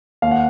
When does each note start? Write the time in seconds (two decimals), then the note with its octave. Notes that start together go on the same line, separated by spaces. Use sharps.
0.22 D#2 F5
0.31 F#5